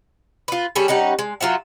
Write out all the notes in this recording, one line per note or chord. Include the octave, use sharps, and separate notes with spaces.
F4 B4
G3 C#4 G#4 A4
G3 C#4 D#4 F#5
G#3
F#3 F4 E5 F#5